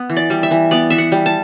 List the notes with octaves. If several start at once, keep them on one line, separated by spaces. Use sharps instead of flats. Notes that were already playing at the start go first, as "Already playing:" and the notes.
Already playing: B3
E3
D5
G3
E5
E3
B3 D5
E3 E5
F#5
G3
A5